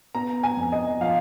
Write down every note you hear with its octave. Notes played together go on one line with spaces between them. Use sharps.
B3 A#5
G#5
F2
D#5
F3 F5